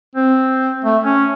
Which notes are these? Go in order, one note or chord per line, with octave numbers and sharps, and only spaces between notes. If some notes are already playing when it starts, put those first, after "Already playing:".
C4
A3
C#4